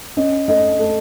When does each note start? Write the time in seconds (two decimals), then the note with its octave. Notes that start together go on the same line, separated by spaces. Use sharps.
0.17 C#4 D#5
0.48 A3 D#5
0.79 A3